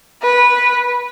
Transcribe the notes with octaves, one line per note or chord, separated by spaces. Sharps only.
B4